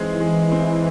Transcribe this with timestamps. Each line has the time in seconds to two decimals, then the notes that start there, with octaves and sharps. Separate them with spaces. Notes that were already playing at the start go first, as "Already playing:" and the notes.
Already playing: E3 G#3 C4 D#4 G#4
0.20 G#3
0.51 C4